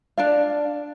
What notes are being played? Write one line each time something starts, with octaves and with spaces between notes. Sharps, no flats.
D4 D5 F5